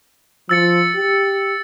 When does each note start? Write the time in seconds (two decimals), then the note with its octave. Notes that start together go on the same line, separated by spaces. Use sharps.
0.49 F3 E6 A6 C#7
0.95 G4